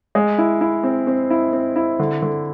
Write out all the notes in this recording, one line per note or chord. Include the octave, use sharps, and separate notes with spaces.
G#3
E4
E4
C4
C4
E4
C4
E4
D3
D3